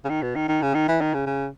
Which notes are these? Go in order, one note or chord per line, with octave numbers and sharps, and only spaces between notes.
C#3
D#3
B2
D#3
D#3
C#3
D#3
E3
D#3
C#3
C#3